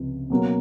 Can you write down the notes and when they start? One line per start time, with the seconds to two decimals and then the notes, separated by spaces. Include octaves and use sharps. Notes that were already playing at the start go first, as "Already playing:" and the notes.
Already playing: C#2 C3 F3
0.30 B2 F#3 A#3 C#4